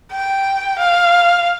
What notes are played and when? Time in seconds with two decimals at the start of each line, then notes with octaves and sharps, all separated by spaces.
0.12 G5
0.78 F5